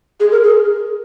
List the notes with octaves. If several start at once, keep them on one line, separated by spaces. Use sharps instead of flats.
G#4
A#4
G#4